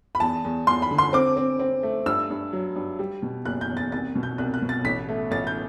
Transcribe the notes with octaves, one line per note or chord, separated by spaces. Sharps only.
B5
E2 A5
E2
E2 C6
B5
D3
C6
C4 D6
C4
C4
A3
G2 E6
G2
F#3
G2
G3
B2
F#1 F#6
G6
E2
A6
C2 A6
B2
G6
C2 F#6
F#6
B2
A6
A1 B6
A3
A1 A6
G6